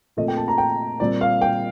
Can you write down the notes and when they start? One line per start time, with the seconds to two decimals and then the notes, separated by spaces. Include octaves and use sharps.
0.17 A#2 F3 A3 C4 D#5
0.28 G5
0.37 A5
0.48 A#5
0.58 G5
1.00 A#2 G3 C4 D5
1.21 F5
1.42 G5